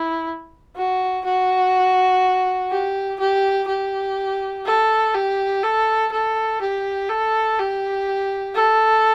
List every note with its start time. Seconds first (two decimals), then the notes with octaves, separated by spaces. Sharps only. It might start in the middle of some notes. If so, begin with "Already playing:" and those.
Already playing: E4
0.76 F#4
1.25 F#4
2.71 G4
3.20 G4
3.68 G4
4.66 A4
5.15 G4
5.64 A4
6.12 A4
6.61 G4
7.09 A4
7.59 G4
8.56 A4